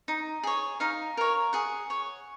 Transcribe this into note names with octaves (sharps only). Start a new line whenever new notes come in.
D#4
G#4 C#5
D#4 F5
A#4 C#5
G#4 F#5
C#5